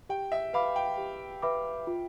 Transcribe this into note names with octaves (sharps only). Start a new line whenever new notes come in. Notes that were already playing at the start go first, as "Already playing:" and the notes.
G4 G5
E5
B4 E5 F5 B5 D6
G5
G4
B4 E5 B5 D6
F4